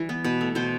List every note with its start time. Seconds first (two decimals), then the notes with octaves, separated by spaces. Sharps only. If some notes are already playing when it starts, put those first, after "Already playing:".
Already playing: E3 G3
0.09 B3
0.24 B2 B4
0.41 A3
0.55 B2 C5